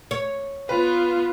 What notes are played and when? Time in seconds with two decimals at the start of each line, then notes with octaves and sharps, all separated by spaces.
0.11 C#5
0.69 B3 F4 B4